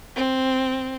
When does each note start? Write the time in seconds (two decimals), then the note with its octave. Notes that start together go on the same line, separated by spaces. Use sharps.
0.16 C4